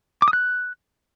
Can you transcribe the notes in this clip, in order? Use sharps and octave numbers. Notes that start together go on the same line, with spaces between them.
D6
D#6
F#6